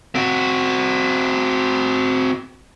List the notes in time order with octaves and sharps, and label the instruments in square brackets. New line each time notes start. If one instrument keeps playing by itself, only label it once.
[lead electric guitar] C4 F#4